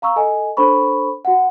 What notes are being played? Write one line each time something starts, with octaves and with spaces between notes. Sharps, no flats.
F5 A#5 C#6 E6
A4 D#5 G#5
D4 A4 C5 B5 C#6
F#4 F#5